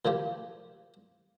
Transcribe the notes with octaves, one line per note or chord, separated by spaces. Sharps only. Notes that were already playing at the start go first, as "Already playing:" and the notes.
A#2 C#3 F3 G4